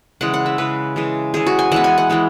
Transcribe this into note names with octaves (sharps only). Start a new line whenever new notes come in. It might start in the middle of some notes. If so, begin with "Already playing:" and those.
C#3 E3 G#3 F#5
F#5
E5
C#3 E3 G#3 B4
C#3 E3 G#3
C#3 E3 G#3 G#4
F#4
G#5
E3 G#3 B3 F#5
G#5
F#5
E3 G#3 B3